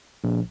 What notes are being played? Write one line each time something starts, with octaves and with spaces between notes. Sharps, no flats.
A#1